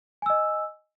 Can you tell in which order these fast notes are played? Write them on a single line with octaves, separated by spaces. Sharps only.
G#5 E6 D#5